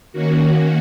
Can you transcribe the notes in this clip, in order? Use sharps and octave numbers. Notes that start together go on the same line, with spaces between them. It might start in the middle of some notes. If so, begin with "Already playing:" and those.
D#3 A#3 C#4 F#4